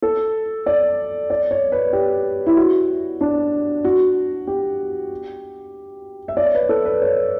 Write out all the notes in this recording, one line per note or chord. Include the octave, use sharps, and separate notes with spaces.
A4
D5
D5
C#5
B4
G4
E4
F#4
D4
F#4
G4
E5
D5
C#5
B4
A4
B4
C#5